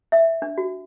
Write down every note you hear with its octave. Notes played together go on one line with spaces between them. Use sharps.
E5
D4
F#4